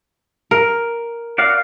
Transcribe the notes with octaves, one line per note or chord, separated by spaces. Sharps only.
A#4
F#4 D5 F5